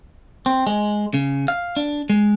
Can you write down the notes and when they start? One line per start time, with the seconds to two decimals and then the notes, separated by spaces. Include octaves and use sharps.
0.46 C4
0.67 G#3
1.14 C#3
1.48 F5
1.77 D4
2.10 G#3